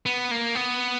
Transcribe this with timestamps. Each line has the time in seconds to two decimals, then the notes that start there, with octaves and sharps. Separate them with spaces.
0.06 B3
0.31 A#3
0.55 B3